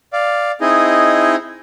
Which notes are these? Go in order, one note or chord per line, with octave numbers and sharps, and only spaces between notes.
D5 F5
C4 D#4 E4 G#4 D#5